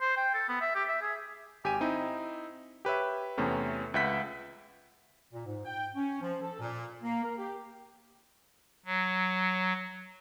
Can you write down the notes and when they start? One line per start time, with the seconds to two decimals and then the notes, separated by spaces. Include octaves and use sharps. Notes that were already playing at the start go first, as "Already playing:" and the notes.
0.01 C5
0.17 G5
0.34 A4
0.49 B3
0.61 E5
0.75 G4
0.89 E5
1.02 G#4
1.64 G#1 G4 G#5 D#7
1.81 C4 D#4 E4
2.85 G4 B4 C#5 E5
3.38 E2 C3 A3 B3 C#4
3.94 C#2 B4 E5 F#5 G6 B6
5.32 A#2
5.45 G#2
5.65 G5
5.95 C#4
6.21 F3
6.42 A4
6.60 A#2
7.03 A#3
7.23 A#4
7.38 G4
8.85 F#3